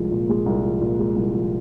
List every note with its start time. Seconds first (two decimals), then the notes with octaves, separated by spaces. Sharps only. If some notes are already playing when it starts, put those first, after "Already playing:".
Already playing: C2 F3 G#3
0.11 A#2
0.29 G#3
0.46 C2
0.64 F3
0.81 A#2
0.99 G#3
1.16 C2
1.33 F3